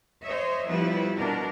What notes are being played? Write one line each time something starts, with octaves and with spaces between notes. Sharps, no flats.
C5 C#5 D#5 E5
B2 F3 G3 E4 B4
B2 D4 A#4